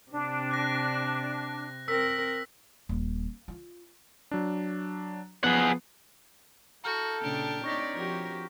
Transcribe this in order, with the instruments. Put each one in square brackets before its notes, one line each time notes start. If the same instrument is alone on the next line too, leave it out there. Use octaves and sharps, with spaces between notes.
[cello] C3 [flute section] D4
[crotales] F#6 A#6
[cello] C4 A#4 [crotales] E6 B6
[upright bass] D#1
F4
[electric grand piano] F#3 D4
[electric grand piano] F3 B3 [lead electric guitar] G#4 F#5
[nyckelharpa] E4 A4 [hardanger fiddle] F#4 [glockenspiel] A#5 F6 G6
[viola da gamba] A#2 C#3 [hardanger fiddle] D4 G4
[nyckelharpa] C4 C#5 [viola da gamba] D#4 D5 [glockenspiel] C#6 A#6 B6
[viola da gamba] F3 F#4 G4 [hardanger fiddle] A#4